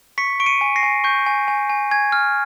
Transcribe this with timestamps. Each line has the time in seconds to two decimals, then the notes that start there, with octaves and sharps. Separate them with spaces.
0.18 C#6 B6 C#7
0.40 C#6 D7
0.46 C#7 D#7
0.61 G#5
0.76 A#6 C7
0.83 G#5
1.04 C#6 G6
1.26 G#5
1.48 G#5
1.69 G#5
1.91 G#5 G#6
2.12 F6